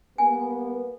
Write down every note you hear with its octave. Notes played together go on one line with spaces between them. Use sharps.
G3 A#3 B3 G#5